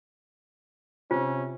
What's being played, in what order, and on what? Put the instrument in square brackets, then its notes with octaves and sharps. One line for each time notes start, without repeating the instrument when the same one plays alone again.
[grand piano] C3 [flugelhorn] C#4 [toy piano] F4